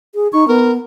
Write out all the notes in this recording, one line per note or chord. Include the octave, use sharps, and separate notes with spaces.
G#4
D#4 C#6
B3 A#4